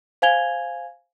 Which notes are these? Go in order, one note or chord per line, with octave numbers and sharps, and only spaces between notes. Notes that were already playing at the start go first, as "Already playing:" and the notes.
C5 F5 G#5 G#6 F7 G7